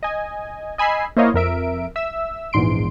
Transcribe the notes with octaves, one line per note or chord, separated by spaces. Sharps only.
D#5 G#5
D#5 G#5 B5 E6 C7
A#3 E4 C5 C#5 D#5 F5
F2 A#4 E5 D7
E5 E6
A#1 E2 G#2 C6 D7